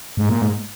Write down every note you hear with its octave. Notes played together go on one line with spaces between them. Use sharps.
G#2
A#2
G#2